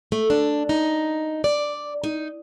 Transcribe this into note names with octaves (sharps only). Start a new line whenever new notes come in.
A3
D4
D#4
D5
D#4